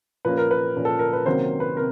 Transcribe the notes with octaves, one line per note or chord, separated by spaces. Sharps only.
A#2 F3 A#3 C#4 B4
A#4
B4
A#2 F3 A#3 C#4
A4
A#4
B4
C3 D#3 F#3 A#3 C#4 C5
B4
C3 A#4